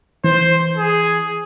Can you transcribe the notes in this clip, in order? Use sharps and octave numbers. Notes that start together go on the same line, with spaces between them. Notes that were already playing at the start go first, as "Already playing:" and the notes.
E3 C5
G#4